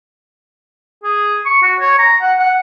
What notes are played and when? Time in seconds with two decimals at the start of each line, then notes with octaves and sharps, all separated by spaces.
1.04 G#4
1.45 C#6
1.63 F#4
1.80 C#5
1.99 A#5
2.21 F#5
2.40 F#5